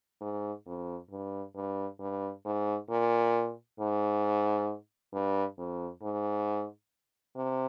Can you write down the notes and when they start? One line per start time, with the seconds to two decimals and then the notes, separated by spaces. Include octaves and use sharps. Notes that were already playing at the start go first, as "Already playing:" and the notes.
0.21 G#2
0.66 F2
1.11 G2
1.55 G2
2.00 G2
2.45 G#2
2.90 A#2
3.79 G#2
5.13 G2
5.58 F2
6.02 G#2
7.36 C3